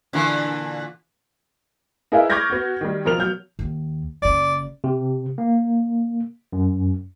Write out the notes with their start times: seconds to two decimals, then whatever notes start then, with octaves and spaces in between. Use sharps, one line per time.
0.13 A#2 D3 E3
2.12 D#4 E4 G#4 A#4 B4 E5
2.30 C#6 D6 F6 G6 G#6 A#6
2.50 B3 F#4
2.81 D#3 G3
3.05 B2 F3 A#4 F6 F7
3.18 F#3 G6
3.59 D#2
4.22 F#1 C#3 D5
4.84 C3
5.38 A#3
6.53 F#2